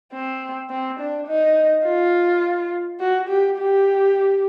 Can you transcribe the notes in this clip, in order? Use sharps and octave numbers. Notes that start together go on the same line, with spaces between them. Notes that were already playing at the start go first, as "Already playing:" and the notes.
C4
C4
D4
D#4
F4
F#4
G4
G4